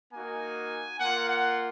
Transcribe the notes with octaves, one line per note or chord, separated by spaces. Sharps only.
A#3 D#4 F#4 G#5
A#3 F4 F#5
F#5